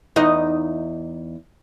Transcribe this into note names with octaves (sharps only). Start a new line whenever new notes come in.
E2 D#4 D#5